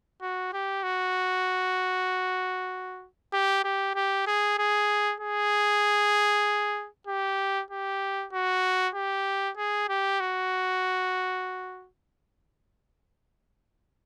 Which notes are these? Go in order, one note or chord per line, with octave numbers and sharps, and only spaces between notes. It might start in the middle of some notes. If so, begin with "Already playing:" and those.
F#4
G4
F#4
G4
G4
G4
G#4
G#4
G#4
G4
G4
F#4
G4
G#4
G4
F#4